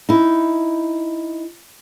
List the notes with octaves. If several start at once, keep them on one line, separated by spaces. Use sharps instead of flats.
D#4 E4